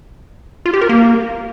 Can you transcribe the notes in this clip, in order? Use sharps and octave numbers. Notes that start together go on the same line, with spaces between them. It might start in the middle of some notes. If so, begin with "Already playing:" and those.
F4
G4
A#4
A#3